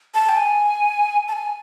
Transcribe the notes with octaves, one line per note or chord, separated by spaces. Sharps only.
A5
G5
G#5
A5
G#5